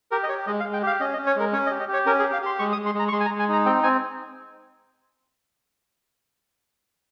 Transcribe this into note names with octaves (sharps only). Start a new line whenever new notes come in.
G4 A#4
D#5
G4 C#5
G#3 D#5
F5
G#3
G5
G4 F5
C#4 D#5
D#5
C#4
C#5
G#3 A#4
C#4 C#5
D#5
G4
D#5
G4 C#5
C#4 A#4
G#4
G4
F5
G4 C6
G#3 C#6
D#6
G#3
C6
G#3 A#5
C#6
G#3 C6
G#5
A#5
G#3
G#5
D#4 A#5
C4 G5
C4 G#5